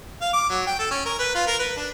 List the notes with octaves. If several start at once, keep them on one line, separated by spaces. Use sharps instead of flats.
F5
D6
F#3
G5
A4
C#4
A#4
B4
F4
A#4
B4
D4